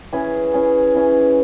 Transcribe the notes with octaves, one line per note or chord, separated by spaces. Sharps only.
E3 C#4 G#4
E3 C#4 G#4
E3 C#4 G#4